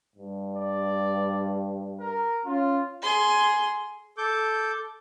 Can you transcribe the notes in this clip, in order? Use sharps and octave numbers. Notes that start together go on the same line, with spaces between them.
G2
D5
A#4
C#4 F4
G#4 C6
A4 D6 G6